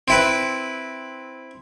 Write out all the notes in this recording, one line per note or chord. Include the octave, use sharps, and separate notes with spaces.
C4 E4 B4